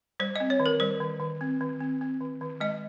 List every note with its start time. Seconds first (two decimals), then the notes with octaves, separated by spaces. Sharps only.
0.20 G3 C5
0.36 C4 D#5
0.50 C#5
0.60 D#3
0.66 A#4
0.80 G3 C5
1.00 D#3
1.20 D#3
1.41 C4
1.61 D#3
1.80 C4
2.01 C4
2.20 D#3
2.41 D#3
2.60 G#3 D#5